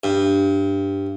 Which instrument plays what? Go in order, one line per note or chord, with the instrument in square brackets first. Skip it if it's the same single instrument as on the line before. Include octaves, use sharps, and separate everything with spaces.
[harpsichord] G2